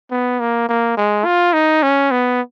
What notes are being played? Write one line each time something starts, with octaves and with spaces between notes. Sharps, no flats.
B3
A#3
A#3
G#3
F4
D#4
C#4
B3